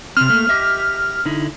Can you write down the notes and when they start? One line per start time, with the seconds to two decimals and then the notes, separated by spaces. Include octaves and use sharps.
0.17 C3 C4 F6
0.29 A3 A#3
0.49 G4 D#5 E5
1.25 D3 D#4 E4